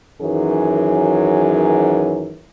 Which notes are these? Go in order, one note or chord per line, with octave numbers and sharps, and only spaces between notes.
F#2 D#3 E3 F#3 G#4